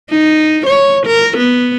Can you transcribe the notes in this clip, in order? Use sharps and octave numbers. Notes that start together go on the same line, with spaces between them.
D#4
C#5
A#4
B3